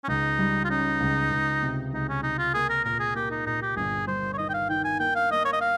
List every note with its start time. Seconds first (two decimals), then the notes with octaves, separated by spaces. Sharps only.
0.04 C#4
0.08 C#2 D#4
0.39 G3
0.65 F4
0.70 C#4 D#4
1.00 C#2
1.31 C#2
1.63 C3
1.93 C#2 D#4
2.09 C#4
2.23 C3 D#4
2.38 F4
2.54 A#3 G#4
2.69 A#4
2.84 A#2 A#4
3.00 G#4
3.15 A#3 G4
3.30 D#4
3.46 A#2 D#4
3.62 G4
3.76 G1 G#4
4.07 G2 C5
4.33 C#5
4.38 D#3 D#5
4.49 G5
4.54 F5
4.68 D#3 G5
4.84 G#5
5.00 A#3 G5
5.15 F5
5.31 A#3 D#5
5.45 C#5
5.53 D#5
5.61 F5